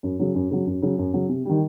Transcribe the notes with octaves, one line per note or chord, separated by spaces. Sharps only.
F#2
C#3 F#3
F#2
C#3 F#3
F#2
C#3 F#3
F#2
C#3 F#3
C3
D#3 G3